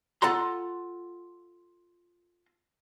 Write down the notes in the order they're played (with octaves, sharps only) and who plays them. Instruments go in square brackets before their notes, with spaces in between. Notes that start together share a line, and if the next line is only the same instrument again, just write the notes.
[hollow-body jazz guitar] F4 A4 F#5 A#5 C6